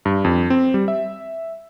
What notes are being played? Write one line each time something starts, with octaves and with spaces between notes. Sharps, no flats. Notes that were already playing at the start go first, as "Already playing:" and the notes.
G2
F2
C4
G3
E5